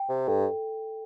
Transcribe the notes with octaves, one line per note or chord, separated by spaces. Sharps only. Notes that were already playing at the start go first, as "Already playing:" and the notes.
Already playing: G5
C3
G2 A4